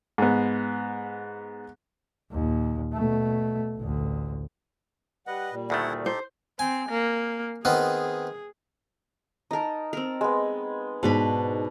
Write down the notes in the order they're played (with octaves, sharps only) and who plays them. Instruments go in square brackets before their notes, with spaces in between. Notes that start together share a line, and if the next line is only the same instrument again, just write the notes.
[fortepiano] G#2 B3
[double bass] D#2 A#2
B2 A3
A1 D2
[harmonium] G3 F#5 [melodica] B4 D#5
[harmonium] A#2 G3
[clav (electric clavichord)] D2 D#3 A3 [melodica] E4 A4 F#5
[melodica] D#4 G4 A4 [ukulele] C5
[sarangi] C4 [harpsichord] G#5
[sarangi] A#3
[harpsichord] D#3 B3 C4 [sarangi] G#4
[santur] D#4 A5 [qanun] A#4 D#5
[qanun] C4 A#4
[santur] G#3 B3
[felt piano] G#2 [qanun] B2 D4 B5 [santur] A5